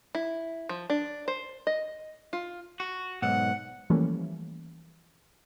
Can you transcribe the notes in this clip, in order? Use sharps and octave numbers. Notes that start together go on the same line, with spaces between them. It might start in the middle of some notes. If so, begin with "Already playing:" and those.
E4
F3
D4
C5
D#5
F4
F#4
B1 G#2 F#5
E3 F3 G3 A3 A#3 C#4